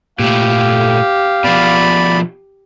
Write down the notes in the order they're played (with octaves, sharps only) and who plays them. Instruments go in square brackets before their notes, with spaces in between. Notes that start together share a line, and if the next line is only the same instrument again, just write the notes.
[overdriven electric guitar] A#2 A3 [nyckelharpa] G4 [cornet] F5
[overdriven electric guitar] B2 F3 [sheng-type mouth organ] D5 B5